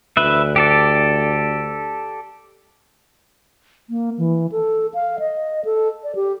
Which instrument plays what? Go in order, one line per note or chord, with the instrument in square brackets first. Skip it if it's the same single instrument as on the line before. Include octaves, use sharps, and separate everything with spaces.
[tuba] D2 [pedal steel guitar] B4 E5
[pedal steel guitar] G4 A4 D5
[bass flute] A#3
E3
A4
F5
D#5
A4
D5
G4